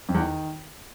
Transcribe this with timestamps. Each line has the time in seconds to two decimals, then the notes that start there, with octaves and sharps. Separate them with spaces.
0.09 F2
0.14 E2
0.20 D#3